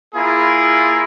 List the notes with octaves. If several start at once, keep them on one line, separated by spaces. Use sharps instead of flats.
A#3 E4 F4 G#4